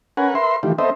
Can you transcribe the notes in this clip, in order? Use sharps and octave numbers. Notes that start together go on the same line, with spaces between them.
C#4 A#4 B4 F#5 G#5
A#4 B4 E5 C6
D#3 E3 A3 F4 G4
B3 C4 A4 C5 D#5 E5